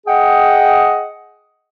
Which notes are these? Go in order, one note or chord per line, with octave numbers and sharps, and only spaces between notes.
G#4 D#5 F#5 G5